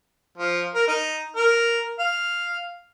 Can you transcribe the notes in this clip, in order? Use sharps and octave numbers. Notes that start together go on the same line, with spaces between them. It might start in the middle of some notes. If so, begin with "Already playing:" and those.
F3
A#4
D#4
A#4
F5